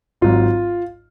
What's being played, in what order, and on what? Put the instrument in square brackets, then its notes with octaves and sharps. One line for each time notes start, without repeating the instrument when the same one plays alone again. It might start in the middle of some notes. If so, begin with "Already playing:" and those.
[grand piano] G#1 G#2 F#3 F4